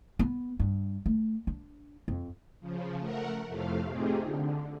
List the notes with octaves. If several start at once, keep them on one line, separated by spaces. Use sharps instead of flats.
B3
G2
A3
D4
F2
C#3 F3
A3 A#4 F#5
F2 A2 C3 A3 F5
A3 C4 D#4 F4 G4 G#4
D3